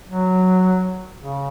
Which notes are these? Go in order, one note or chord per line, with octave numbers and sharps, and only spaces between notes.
F#3
C#3